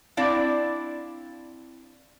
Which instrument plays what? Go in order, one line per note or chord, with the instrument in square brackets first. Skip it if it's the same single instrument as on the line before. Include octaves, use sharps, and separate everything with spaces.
[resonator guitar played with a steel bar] C4 D4 E4 D5 F5